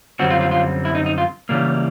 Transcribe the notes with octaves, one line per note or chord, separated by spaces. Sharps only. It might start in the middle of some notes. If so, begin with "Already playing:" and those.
F#2 D3 G3 C4 F#4
F4
F4
F4
E4
D#4
D#4
F4
C#3 E3 G3 A#3